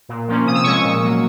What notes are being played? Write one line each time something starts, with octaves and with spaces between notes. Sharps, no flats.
A#2
F3 A#3 C#4
C3 D#6
E6
F3 G#3 C#4 C#6 D#6
A#2
F#3 A#3